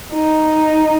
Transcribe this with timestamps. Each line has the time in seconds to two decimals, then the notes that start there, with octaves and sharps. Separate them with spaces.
0.13 D#4